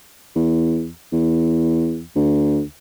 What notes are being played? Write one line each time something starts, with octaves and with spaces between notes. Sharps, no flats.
E2
E2
D2